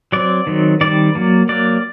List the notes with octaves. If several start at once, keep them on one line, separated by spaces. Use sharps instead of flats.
F#3 C4 D5
D#3 F#3 C4
D#3 G3 C4 D5
F#3 A#3
F#3 A#3 D5